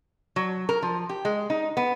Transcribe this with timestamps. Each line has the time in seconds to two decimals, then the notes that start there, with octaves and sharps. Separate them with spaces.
0.36 F#3
0.69 A#4
0.82 F3
1.09 G4
1.25 G#3
1.50 D#4
1.77 B3